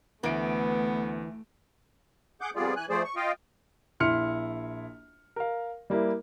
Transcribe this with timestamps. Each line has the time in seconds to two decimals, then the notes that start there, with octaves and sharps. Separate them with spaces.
0.23 D2 E3 A3 B3 D7
2.41 G#4 F#5 D6 G6
2.56 F2 G3 B3 F4 G#4 D5
2.76 E3 G#5 F#6
2.90 F3 A3 G#4 C5 D5
3.04 C#6
3.16 F4 D#5 F5 G5
4.00 A#1 E4 C6 F6 C#7
5.36 A#4 F5
5.90 G3 A#3 E4